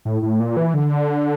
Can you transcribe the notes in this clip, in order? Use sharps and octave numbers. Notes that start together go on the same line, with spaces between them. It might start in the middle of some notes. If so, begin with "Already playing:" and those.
A2
A2
A#2
E3
D3